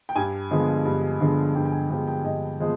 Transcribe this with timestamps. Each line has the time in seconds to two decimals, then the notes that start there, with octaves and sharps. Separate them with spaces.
0.09 G5
0.16 G2 G#5
0.51 D3 F3 G#3 B3
0.85 G2
1.20 D3 F3 G#3 B3
1.55 G2 G5
1.65 G5
1.72 G#5
1.90 D3 F3 G#3 B3 G5
2.07 G5
2.24 G2 D#5
2.60 F3 G#3 B3